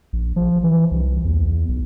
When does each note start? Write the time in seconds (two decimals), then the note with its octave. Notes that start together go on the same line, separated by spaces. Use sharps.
0.13 A#1
0.36 F3
0.64 E3
0.91 C2
1.25 E2
1.68 B1